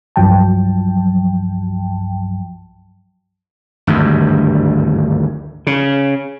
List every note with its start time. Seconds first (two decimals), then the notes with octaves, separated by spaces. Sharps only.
0.16 C2 G2 F3 F#3 G5 A5
3.87 G#1 D2 G2
5.67 C#3